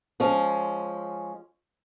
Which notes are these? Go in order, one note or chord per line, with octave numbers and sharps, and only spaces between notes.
F3 G#3 C#4